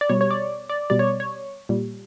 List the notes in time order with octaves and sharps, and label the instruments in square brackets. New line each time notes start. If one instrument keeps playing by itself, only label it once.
[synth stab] D5
B2 G3 C#5
C#5
D5
D5
B2 G3 D5
C#5
C#5
A#2 G3